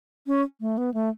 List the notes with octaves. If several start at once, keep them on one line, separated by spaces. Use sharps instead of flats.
C#4
A3
B3
A3